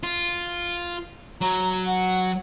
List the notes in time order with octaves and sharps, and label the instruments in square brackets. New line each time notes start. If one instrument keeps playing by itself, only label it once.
[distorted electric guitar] F4
[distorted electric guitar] F#3 [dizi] A#5
[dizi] F#5